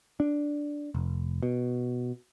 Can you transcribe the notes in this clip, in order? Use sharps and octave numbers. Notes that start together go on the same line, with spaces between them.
D4
F1
B2